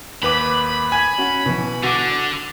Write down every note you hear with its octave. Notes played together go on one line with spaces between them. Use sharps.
D#2 B4 B5 D6
G#5 G#6
C#4 F#4
B2 E3
D3 F#4 D6